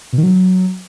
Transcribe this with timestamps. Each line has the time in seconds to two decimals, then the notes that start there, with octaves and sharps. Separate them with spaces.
0.13 B2
0.18 D#3
0.23 F#3